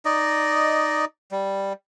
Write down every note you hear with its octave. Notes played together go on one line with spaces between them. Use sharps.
D#4 D5 D#5
G3